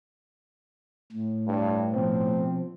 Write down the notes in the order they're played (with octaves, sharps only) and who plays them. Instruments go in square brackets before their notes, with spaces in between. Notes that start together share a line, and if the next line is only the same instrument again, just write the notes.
[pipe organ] A2
[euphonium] G2
[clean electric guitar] B2 F3 [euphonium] C4